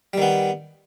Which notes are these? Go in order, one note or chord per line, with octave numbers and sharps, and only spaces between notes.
D#3 G3 B3